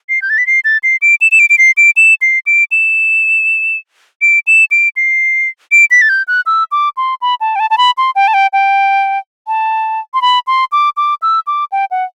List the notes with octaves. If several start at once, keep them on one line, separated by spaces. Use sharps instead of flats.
C7
G6
A6
B6
C7
A6
C7
D7
E7
E7
D7
D7
C7
D7
E7
C7
D7
E7
D7
E7
D7
C7
D7
B6
A6
G6
F#6
E6
D6
C6
B5
A5
G5
A5
A5
B5
C6
G5
A5
G5
G5
A5
C6
B5
C6
D6
D6
E6
D6
G5
F#5